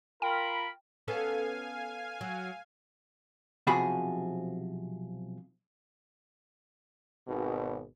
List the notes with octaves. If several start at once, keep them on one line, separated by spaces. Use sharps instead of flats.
F4 A#4 G5 B5
B3 C#4 A4 F5 G#5
F#3
B1 C3 F3 F#4 G#4 B5
G#1 B2